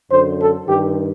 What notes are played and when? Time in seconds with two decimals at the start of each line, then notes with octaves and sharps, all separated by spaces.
0.12 F#2 D3 C5
0.40 A4
0.68 G2 D#3 G4